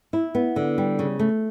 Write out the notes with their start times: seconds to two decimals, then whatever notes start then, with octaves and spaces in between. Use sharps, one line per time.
0.13 E4
0.35 B3
0.56 D3
0.78 G3
0.99 C#3
1.19 A3